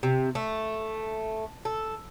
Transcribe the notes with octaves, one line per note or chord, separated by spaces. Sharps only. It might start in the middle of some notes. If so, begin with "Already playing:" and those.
C3
A3
A4